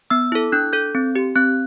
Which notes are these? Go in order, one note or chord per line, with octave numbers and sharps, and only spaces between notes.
B3 E6
E4 A4
D4 F#6
A4 G6
C4
G4
C4 F#6